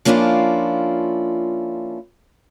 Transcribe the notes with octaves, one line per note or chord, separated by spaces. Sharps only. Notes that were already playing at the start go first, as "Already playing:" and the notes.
F3 A#3 C#4 D4 E4 F4